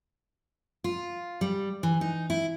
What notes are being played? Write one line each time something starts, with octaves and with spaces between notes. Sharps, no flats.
F4
G3
E3
D#4
E4